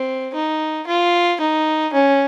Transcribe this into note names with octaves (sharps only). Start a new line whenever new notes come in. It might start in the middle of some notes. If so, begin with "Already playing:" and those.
Already playing: C4
D#4
F4
D#4
C#4